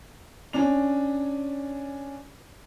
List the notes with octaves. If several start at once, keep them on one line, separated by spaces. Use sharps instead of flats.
C#4 D4 F7